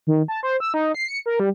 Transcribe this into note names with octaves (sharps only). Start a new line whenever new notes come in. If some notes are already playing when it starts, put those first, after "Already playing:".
D#3
A5
C5
E6
D#4
C7
C#7
A#4
G3